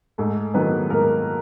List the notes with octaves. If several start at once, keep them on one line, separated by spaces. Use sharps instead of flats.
G#2 A3 A4
D#3 F#3 B3 B4
G#2 A#3 A#4